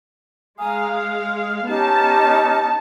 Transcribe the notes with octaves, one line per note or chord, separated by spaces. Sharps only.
G#3 F5 G#5 A#5 D#6
D#6
B3 C#4 D#4 G4 A5